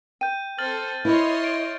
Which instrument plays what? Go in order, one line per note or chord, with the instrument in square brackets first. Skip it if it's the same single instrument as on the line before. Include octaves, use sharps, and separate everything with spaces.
[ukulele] G5 [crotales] G6 D#7
[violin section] C4 A4 C5 [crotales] F6 A6 F#7
[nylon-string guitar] E4 [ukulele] B4 B5 [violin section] C#5 D#5 C6
[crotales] D7